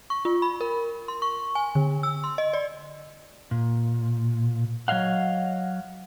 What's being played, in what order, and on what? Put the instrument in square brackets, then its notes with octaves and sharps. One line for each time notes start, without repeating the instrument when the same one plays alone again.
[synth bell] C#6
F4
B5
A#4
C6
C#6
G#5
D3
E6
C6
D#5
D5
[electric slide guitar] A#2
F#3 C#5 D#5 F5 F#5